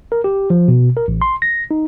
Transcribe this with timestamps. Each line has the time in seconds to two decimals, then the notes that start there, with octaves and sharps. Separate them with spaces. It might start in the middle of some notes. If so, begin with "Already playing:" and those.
0.12 A#4
0.24 G4
0.50 F3
0.68 B2
0.97 A#4
1.08 A1
1.22 C6
1.42 A#6
1.71 D#4